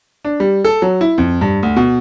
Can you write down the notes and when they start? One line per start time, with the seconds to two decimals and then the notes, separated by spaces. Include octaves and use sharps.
0.25 D4
0.40 G3
0.64 A4
0.82 F#3
1.01 E4
1.18 F2
1.41 G2
1.63 D2
1.76 B2